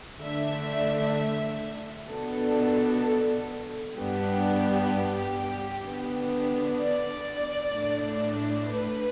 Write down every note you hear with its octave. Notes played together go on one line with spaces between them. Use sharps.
D3 A3 D4 E5
B2 B3 D4 A4
G2 G3 B3 D4 G4
D3 B3 D4
D5
A2 A3 D4
B4